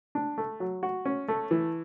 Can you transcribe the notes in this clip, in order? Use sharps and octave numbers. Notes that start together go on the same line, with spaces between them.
D4
A3
F#3
F#4
C#4
A3
E3